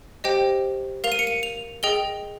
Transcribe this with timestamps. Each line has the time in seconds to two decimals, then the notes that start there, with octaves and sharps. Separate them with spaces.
0.24 G4 C5 D#5 G5
1.04 A#4 F5 F7
1.12 D#7
1.19 C#7
1.27 D#7
1.43 F7
1.83 G#4 D#5 G5 G7